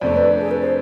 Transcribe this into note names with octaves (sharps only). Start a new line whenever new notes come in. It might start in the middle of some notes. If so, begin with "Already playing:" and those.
F2 C3 F3 A3 D4 D5
B4
A4
G#4
B4
C5